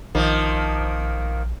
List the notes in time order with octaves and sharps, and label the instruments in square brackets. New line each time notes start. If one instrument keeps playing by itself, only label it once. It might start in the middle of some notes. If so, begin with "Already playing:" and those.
[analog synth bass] A#1 [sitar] D#3 F3 A#3